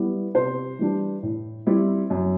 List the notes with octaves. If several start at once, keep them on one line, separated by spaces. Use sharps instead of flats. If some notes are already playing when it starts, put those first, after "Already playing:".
Already playing: G3 B3 E4
C3 C5
E3 G3 D4
A2
G3 C4 E4
F#2